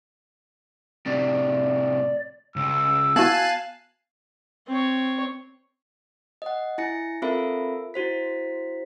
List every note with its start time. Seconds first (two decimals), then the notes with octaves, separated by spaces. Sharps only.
1.06 A2 C3 D5
2.56 C#2 E6
3.16 B3 E4 F#4 F5 G#5 A5 F#6
4.67 C4 C#5
6.42 D#5 F#5
6.78 E4 G#5 A#6 C#7
7.22 C4 F4 A4 A#4 E5 B5
7.94 E4 F#4 C5 B6